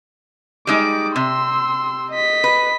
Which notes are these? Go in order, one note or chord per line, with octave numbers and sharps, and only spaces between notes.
G3 G#3 D#4 D6
C3 C6 E6
D#5 B6
B4